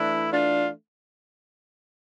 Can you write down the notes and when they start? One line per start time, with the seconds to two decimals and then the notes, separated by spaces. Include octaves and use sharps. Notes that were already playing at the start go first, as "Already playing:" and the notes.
Already playing: E3 A3 D4 E4
0.32 D4 F4